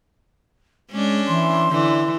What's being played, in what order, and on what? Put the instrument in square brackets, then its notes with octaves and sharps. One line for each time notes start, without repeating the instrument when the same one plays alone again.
[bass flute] G#3 [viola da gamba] C#4 D4
[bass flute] E3 [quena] C6
[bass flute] D3 [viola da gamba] E3